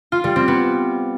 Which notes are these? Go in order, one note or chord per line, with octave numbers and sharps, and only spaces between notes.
F4
G3
C4
B3